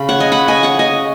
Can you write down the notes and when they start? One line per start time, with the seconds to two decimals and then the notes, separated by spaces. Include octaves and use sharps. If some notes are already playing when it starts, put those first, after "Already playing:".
Already playing: C#3 C#4 B5
0.09 C#5 F#5
0.20 D#5 G#5
0.32 F#5 B5
0.48 D#5 G#5
0.63 C#5 F#5
0.79 D#5 G#5